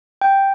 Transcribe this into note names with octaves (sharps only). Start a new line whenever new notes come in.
G5